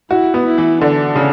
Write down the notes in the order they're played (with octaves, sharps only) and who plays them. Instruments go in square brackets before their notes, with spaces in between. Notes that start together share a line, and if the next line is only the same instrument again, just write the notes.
[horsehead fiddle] E4 [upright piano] F#4
[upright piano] B3
[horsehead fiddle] E4
[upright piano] E3
[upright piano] D3 [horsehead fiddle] D4
[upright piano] C#3